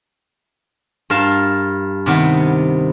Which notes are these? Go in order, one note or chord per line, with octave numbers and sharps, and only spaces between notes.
G2 F4 A#4 F5 A5
C3 D#3 B3